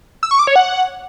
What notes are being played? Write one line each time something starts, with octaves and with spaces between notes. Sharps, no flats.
E6
C#6
D6
C#5
F#5